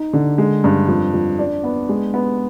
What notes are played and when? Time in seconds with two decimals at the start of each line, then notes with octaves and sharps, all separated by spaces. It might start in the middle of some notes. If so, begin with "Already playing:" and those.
Already playing: D#4
0.13 D3
0.38 G#3
0.64 G2
0.88 F2
1.14 F2
1.39 D4
1.64 B3
1.89 G#3
2.14 B3